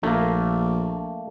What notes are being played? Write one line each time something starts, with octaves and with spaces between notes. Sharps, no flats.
A#1 A3 A#3